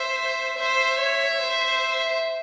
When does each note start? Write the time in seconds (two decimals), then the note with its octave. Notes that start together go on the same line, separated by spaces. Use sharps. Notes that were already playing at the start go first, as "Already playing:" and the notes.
Already playing: C5 E5
0.58 C5 E5
0.99 C#5
1.41 C5